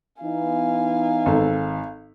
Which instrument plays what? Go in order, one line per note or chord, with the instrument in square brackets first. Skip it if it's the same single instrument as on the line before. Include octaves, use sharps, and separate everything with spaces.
[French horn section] E3 B3 D#4 [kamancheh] F5 G#5
[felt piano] G#1 A4